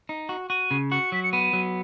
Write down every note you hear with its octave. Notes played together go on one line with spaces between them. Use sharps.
D#4
F#4
F#4 D#7
C#3
F#4 C#7
F#3 B6
C#7
B3 D#7
F#3